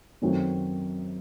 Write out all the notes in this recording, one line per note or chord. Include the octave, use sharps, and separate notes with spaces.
F#2 D#3 A3 C4 F#4